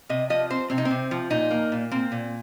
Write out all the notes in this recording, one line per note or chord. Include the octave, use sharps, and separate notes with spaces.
C3 D#5
F3 D#5
C4 C5
C3 C4
D#4
C4
C3
F3
A#2 D#4
A#3
A#2
A#3 C4
A#2